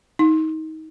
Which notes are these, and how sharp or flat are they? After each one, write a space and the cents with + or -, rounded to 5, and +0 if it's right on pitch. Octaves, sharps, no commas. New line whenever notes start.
D#4 +25